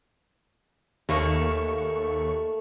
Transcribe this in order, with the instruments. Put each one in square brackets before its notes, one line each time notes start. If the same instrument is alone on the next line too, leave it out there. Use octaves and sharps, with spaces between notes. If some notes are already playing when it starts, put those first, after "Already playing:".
[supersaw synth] D#2 C#6 [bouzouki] A3 A#3